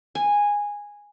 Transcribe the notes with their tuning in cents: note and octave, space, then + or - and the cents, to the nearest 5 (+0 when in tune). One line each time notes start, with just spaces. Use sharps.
G#5 -10